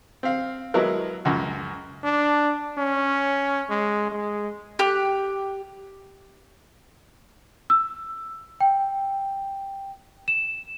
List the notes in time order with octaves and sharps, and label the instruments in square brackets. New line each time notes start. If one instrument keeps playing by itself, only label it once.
[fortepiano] C4 F5
F#3 G#3 B3 E4 A#4
C#2 F#2
[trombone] D4
C#4
G#3
G#3
[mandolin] G4 F#6
[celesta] E6
G5
E7